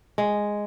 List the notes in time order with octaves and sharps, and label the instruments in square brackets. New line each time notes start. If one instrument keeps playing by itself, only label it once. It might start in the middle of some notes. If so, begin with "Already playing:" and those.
[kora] G#3